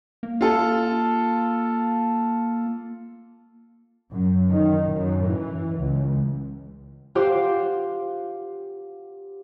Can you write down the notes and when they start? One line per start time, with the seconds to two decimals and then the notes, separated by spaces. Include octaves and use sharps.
0.23 A#3
0.41 F4 A4
4.12 F#2
4.49 D#3
4.91 F#2
5.25 E3
5.78 C#2
7.15 F4 G4 C5 F5 F#5 D6